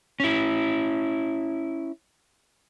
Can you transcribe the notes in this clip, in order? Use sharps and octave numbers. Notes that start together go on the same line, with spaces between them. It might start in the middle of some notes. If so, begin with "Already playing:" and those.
C#4 E4